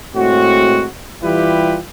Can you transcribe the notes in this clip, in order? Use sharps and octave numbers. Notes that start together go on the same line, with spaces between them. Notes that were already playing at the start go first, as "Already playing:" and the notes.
A2 G#3 C4 F#4
E3 G3 E4 F4 G4 B4